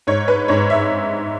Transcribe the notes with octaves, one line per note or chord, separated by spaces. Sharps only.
G#2 C#5
B4
G#2 C#5
E5